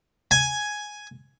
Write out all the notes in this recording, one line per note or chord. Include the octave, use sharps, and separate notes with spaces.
G#5